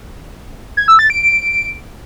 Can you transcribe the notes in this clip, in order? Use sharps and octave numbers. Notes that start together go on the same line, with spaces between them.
G#6
E6
A6
D7